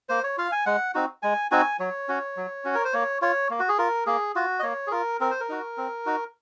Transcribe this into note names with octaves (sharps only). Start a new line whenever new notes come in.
A#3 C5
C#5
F4 F5
G#5
G#3 F#5
C4 D#4 F#4
G#3 G#5
C4 D#4 F#4 G#5
F#3 C#5
C#4 F#4
F#3
C#4 F#4
A#4
C5
A#3 C#5
F4 C#5
A#3
F#4
G#4
F4 A#4
A#3 G#4
F4 F#4
D#5
A#3 C#5
G#4
F4 A#4
C4 A#4
C5
A#4
D#4 F#4
C4
D#4 F#4